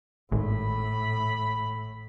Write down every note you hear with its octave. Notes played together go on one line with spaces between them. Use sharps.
G#1 A2 B5